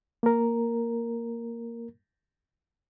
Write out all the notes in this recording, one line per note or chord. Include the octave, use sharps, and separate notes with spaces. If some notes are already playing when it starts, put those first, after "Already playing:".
A#3 A#4